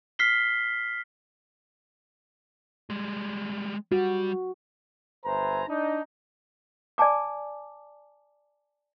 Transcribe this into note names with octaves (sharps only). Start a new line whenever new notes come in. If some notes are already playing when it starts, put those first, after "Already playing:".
F6 B6 C7 G7
G3 G#3
G3 F#4
G1 B4 C5 E5 G#5 A#5
D4 D#4
D5 G#5 A5 D6